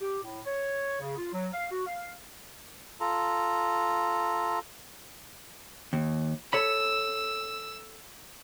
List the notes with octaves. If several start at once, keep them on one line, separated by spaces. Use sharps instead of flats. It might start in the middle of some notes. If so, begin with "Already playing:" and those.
G4
A2
C#5
C#3
F4
F#3
F5
F#4
F5
F4 A4 A#5
D#2
A4 C#5 B5 E6